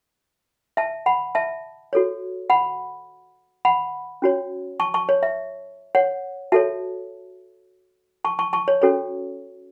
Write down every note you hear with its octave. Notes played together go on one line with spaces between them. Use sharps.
E5 A5
F#5 B5
E5 A5
F#4 A4 C#5
F#5 B5
F#5 B5
C#4 F#4 C#5
A5 C#6
A5 C#6
C#5
E5
C#5 F#5
F#4 A4 C#5 E5 A5
A5 C#6
A5 C#6
A5 C#6
C#5
C#4 F#4 A4 C#5